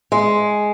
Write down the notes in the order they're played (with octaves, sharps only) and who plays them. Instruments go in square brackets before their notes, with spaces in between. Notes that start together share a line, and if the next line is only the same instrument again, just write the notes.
[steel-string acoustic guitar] G#3